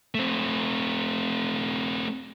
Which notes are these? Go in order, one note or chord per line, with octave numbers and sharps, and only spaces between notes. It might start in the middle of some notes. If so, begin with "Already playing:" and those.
A3 C4